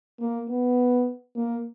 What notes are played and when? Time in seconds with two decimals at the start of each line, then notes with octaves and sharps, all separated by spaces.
0.20 A#3
0.48 B3
1.35 A#3